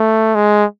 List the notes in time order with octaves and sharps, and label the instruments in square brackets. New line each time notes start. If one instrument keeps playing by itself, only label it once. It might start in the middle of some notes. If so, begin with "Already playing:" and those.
Already playing: [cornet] A3
G#3